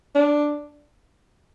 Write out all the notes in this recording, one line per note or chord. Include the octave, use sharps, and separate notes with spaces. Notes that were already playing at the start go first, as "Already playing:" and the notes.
D4